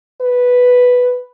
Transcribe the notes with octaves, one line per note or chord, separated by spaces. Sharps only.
B4